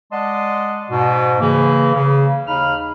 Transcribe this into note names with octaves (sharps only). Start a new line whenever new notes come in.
G#3 D5 D#5 F#5 A5 C6
G#2 B2
C#3 E3 A#3
C#3
D#2 D#4 F5 B5 F6